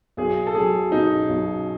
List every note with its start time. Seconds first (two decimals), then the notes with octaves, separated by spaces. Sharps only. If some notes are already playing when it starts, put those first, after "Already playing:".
0.17 B1 G#4
0.47 A4
0.55 F#3 G#4
0.91 B2 D#4
1.29 B1